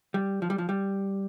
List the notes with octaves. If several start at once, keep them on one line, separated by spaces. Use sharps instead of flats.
G3
F3
G3
F3
G3